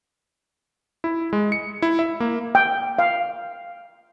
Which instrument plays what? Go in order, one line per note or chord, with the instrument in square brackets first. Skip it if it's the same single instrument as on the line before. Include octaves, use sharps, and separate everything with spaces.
[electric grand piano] E4
G#3
C#7
E4
E5
A#3
[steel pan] G5
F5